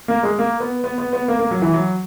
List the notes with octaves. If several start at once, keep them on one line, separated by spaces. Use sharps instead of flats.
A#3
G#3
A#3
B3
B3
B3
B3
A#3
A#3
F#3
E3
F#3